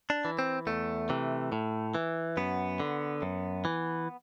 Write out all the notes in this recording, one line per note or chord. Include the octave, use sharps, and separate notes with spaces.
D4
E3
C4
E2 A3
C3 E3
A2
E3
F#2 B3
D3
F#2
E3